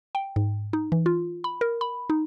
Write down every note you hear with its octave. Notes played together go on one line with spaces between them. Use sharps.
G5
G#2
D#4
E3
F4
B5
A#4
B5
D#4